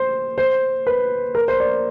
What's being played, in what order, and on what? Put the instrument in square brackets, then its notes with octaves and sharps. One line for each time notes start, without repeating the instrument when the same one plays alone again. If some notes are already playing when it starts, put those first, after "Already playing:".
Already playing: [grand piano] C5
C5
B4
A#4
C5
D5